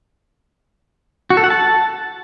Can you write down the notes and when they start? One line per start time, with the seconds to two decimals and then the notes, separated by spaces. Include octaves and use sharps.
1.30 F#4
1.37 A4
1.44 F#5
1.50 A5